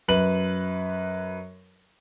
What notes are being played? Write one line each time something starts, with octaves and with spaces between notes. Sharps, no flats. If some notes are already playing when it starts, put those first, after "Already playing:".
F#2 B4 F#7